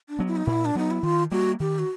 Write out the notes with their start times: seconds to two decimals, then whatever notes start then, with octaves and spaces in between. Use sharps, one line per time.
0.09 D4
0.19 F#3 B3
0.28 E4
0.36 D#4
0.46 A#2 E4
0.65 D4
0.75 F#3 B3 D#4
0.91 E4
1.03 D#3 F4
1.32 G3 A#3 F#4
1.60 D#3 G4
1.79 F#4